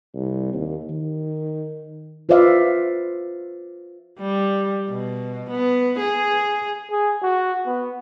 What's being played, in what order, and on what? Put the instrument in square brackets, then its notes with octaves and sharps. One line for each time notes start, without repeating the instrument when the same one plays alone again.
[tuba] C2
D#2
D#3
[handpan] F4 B4 C5 D5 E5 F5
[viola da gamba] G3
B2
B3
G#4
[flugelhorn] G#4
F#4
B3